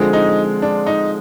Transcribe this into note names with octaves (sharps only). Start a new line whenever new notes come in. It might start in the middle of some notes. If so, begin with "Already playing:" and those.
Already playing: D3 F3 G#3 C4
D#4
D4
D#4